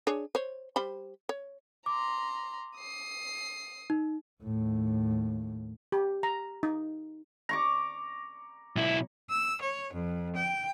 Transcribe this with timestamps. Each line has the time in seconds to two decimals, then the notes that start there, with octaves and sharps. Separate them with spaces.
0.07 D4 G#4 C#5
0.35 C5 C#5
0.76 G3 C5 B5
1.29 C#5
1.86 A#5 C6 D6
2.78 D#6 C7
3.90 D#4
4.43 D#2 A2
5.92 G4
6.23 A#5
6.63 D#4
7.49 A#5 C#6 D6
8.76 B1 E4
9.30 E6
9.61 C#5
9.94 F2
10.36 G5